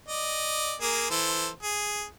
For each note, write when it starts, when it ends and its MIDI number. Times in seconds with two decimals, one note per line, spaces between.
0.08 0.74 74
0.08 0.74 75
0.81 1.09 58
0.81 1.09 68
1.10 1.48 52
1.10 1.48 69
1.10 1.48 72
1.63 2.03 68